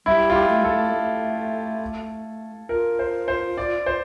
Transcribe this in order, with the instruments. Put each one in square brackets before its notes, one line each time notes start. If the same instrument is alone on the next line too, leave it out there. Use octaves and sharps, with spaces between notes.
[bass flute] G3 [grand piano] E4
[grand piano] F4
G4
[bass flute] A3
[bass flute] G3 [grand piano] A4
[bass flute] A3
A3
[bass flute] F4 [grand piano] A#4
[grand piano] C5
C5
D5
C5